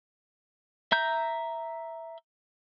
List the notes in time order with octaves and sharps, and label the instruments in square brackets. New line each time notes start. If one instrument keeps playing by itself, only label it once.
[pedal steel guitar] E5 A#5 G6